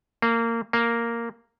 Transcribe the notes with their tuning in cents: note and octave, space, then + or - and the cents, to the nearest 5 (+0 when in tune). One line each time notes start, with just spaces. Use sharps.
A#3 -20
A#3 -5